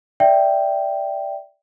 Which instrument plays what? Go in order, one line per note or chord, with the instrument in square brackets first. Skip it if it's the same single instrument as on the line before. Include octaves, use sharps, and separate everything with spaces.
[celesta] D5 E5 G5